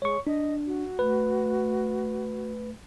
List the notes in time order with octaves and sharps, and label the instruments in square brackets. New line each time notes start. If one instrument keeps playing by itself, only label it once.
[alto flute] G#3 [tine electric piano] C#5 C#6
[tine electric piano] D4 [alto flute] D#5
[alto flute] F#4
[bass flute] A3 [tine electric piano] B4